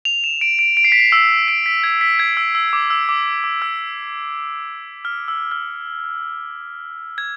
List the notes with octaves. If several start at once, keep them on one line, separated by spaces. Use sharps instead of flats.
F7
E7
D7
D7
D7
C7
B6
C7
E6
D7
B6
G#6
B6
G#6
E6
E6
D6
E6
D6
D6
E6
F6
E6
F6
G#6